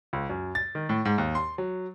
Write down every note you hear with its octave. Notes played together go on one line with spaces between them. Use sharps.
C#2
F#2
A6
D#3
A2
G#2
D#2
C6
F#3